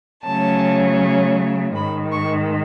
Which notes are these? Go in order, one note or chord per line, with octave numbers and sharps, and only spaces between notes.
C#3 F#3 A3 C#4 A5
G#2 D#3 G#3 B5
C#6